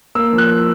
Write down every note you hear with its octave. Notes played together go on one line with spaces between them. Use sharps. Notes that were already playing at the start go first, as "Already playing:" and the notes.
A#3 E6
F3
F#6